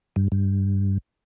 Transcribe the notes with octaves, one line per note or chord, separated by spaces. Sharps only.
G2
G2